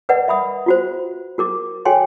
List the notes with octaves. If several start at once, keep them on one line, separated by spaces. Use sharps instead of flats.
A#4 B4 D5 D#5 F#5
E5 B5 D#6
F4 F#4 C5
F#4 A#4 D6
F#4 A4 C#5 G5 G#5 C6